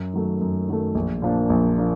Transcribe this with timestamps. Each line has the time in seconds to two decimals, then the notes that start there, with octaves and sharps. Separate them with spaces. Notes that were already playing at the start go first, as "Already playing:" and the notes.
Already playing: F#2
0.13 D#3 F#3 A3
0.41 F#2
0.68 D#3 F#3 A3
0.95 A#1
1.22 A#2 F3 A#3 D4
1.50 A#1
1.78 F3 A#3 D4